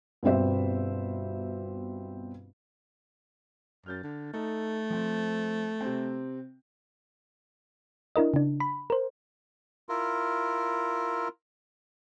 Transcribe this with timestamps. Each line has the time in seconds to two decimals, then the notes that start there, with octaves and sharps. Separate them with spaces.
0.23 G1 B2 G3 C4 C5 E5
3.86 F#2 F6 G6 A6
4.03 D3
4.33 A3 D#4 A4
4.90 F3 C4
5.81 C3 C4
8.16 D4 E4 A#4 D#5
8.34 C#3 D4
8.60 B5
8.90 A#4 C5
9.89 E4 F4 A#4